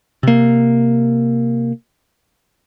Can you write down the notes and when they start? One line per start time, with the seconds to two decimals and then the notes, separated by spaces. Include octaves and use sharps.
0.23 C3 A#3